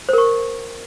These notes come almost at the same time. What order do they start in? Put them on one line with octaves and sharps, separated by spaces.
C5 A#4 C#6